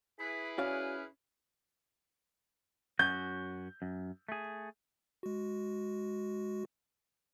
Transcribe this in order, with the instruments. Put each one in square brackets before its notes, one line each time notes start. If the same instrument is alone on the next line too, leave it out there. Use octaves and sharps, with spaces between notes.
[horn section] E4 G#4 B4 [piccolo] B6
[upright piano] C#4 [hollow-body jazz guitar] F#4 D5 F5 [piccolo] F6
[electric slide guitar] F#2 C#4 F#4 [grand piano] G6
[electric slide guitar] F#2
A3 G#4
[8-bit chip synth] G#3 F#4